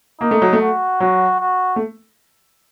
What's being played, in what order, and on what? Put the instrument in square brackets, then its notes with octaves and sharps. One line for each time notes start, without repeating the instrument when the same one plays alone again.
[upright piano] A#3 [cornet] D#4
[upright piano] A3
F#3
A3
[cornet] F#4
[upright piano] F#3 [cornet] F#4
[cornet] F#4
[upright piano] A3